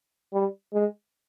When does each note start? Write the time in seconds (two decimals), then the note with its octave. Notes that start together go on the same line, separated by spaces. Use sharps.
0.33 G3
0.74 G#3